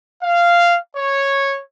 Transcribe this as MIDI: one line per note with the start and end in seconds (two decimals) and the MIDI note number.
0.23 0.78 77
0.96 1.60 73